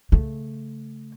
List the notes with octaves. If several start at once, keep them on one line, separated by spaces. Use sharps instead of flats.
C#3 A3